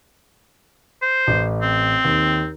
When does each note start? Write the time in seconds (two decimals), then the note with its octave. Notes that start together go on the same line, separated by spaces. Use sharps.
1.02 C5
1.27 A1
1.62 C4
2.04 D#2